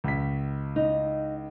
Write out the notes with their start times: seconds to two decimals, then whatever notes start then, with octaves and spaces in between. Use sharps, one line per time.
0.04 C#2 B6
0.76 D#4